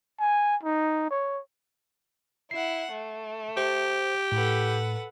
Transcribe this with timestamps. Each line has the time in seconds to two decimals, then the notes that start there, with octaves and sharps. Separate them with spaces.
0.19 G#5
0.63 D#4
1.10 C#5
2.51 E4 F#5 C7
2.91 A3
3.57 G4 C5
4.32 A2 A4 B4 F#5